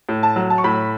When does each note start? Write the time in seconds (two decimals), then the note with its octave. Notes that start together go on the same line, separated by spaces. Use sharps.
0.09 A2
0.23 A5
0.36 F#3
0.50 A5
0.58 C#6
0.64 A2 B5